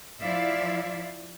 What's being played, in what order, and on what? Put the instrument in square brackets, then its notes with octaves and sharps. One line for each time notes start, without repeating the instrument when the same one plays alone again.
[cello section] F3 E4 D5 E5 F5